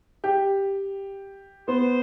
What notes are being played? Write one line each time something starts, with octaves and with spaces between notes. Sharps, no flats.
G4
B3 C5